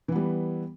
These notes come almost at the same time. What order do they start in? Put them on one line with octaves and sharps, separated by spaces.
E3 B3 G3